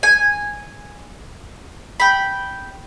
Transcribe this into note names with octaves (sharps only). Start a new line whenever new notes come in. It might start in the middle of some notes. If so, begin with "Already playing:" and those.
G#5
G5 B5